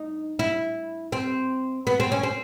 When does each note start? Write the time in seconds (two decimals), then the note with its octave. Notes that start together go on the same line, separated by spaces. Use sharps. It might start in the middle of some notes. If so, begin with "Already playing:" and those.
Already playing: D#4
0.39 E4
1.12 C4
1.87 B3
2.00 C4
2.12 C#4
2.23 C4